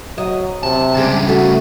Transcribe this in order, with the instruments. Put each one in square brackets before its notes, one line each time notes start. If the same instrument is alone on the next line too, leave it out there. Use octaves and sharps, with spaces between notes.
[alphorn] F#3 [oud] D#5
[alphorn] C3 [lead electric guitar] A5
[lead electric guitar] C#3 G3 [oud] G#3 D4
[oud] A3 [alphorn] F#4